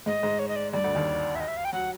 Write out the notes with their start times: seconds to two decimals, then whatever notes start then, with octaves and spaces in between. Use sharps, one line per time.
0.06 G#2 G#3 D#5
0.23 G#2 G#3
0.39 C#5
0.48 D#5
0.56 D5
0.73 G2 G3 D5
0.84 D2 D3
0.95 D#2 D#3
1.35 E5
1.40 D#5
1.48 E5
1.57 F5
1.65 G5
1.73 F#3 F#5